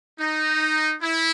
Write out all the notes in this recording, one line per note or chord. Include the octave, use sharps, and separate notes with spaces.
D#4
E4